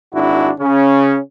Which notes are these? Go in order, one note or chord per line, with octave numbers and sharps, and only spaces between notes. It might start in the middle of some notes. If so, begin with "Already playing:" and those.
G#1 D4 E4 F#4
C#3 C#4